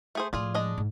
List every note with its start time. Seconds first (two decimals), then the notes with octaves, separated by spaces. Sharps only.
0.15 A3 G#4 C5
0.33 A2 F3 F4 G#4 D5
0.54 G#3 D4 D#5
0.78 G#2